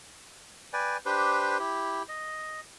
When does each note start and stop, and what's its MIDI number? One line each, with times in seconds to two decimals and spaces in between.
0.73 0.97 71
0.73 0.97 74
0.73 0.97 79
0.73 0.97 80
1.06 1.58 62
1.06 1.58 67
1.06 1.58 71
1.06 1.58 72
1.59 2.03 64
1.59 2.03 67
2.09 2.60 75